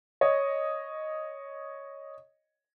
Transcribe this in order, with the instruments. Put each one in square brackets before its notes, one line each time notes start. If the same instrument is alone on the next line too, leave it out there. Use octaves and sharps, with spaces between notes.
[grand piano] C#5 D#5